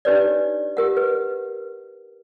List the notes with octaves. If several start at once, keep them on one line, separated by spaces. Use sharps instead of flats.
D4 D#4 G4 B4 C#5 D5
G4 A#4 F#5
B4